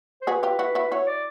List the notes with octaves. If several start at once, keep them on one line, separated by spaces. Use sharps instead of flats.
C5
F#4 G#4 B4
F4 G4
E4 F#4 B4
E4 F#4
E4 F#4 C#5
D5